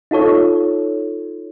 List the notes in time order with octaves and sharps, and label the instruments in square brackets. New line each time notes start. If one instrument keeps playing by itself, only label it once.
[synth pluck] D#4 F4 A4 C#5